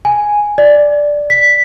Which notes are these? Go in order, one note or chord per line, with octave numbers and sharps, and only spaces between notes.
G#5
D5
B6